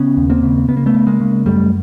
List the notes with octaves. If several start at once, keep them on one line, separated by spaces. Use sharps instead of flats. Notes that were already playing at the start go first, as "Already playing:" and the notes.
Already playing: C#3 B3 C#4
D#2
A#3 C4
C#3
C#3 B3
A#3
A3 B3
C#3
G#3 A#3
C#3
F#2 G3 A3